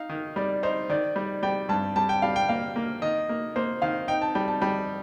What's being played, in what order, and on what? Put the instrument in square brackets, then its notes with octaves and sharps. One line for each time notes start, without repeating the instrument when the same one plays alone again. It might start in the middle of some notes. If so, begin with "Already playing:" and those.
Already playing: [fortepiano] D#4 [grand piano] F5
[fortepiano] D#3
[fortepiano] G3 [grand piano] D5
[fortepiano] D#4 [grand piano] C5
[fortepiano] D#3 [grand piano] D5
[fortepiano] G3
[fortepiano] G3 [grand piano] G5
[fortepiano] G2 [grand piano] A5
[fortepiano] G3 [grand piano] A5
[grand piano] G5
[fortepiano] G3 [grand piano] F5
[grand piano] G5
[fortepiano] A#3 [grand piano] F5
[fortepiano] A#3
[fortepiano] D#3 [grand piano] D#5
[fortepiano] A#3
[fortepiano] A#3 [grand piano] C5
[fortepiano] D#3 [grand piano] F5
[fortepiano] D#4 [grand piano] G5
[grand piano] A5
[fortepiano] G3 [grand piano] G5
[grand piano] A5
[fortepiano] G3 [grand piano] G5